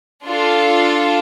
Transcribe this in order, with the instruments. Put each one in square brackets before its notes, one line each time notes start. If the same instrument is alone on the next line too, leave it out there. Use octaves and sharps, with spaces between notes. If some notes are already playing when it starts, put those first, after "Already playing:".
[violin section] D4 F4 A4